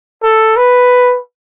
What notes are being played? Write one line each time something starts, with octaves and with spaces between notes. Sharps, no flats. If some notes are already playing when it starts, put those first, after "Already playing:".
A4
B4